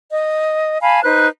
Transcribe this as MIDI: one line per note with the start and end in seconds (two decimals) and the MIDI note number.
0.11 0.77 75
0.81 1.03 77
0.81 1.03 80
0.81 1.03 81
0.81 1.03 83
1.03 1.27 63
1.03 1.27 71
1.03 1.27 72
1.03 1.27 90